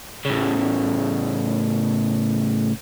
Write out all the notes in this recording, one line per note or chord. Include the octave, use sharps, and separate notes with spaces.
A2 C#3